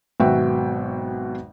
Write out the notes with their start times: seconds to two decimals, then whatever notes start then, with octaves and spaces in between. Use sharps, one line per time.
0.20 G#1 B2 F#3 F#4 E5 G5